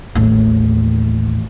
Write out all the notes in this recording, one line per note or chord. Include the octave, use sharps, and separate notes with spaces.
A1 D#2